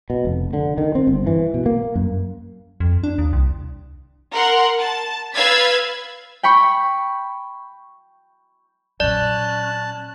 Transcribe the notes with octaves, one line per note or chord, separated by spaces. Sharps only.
B2
F1
D3
D#3
C4
G1
E3
B2
A#3
F#2
F2
D4
D#2
C2
A#4 F#5 C6
A5
B4 F5 E6 G#6 A6 B6
G5 B5 C#6
A#2 F#3 C#4 D5 A5 F#6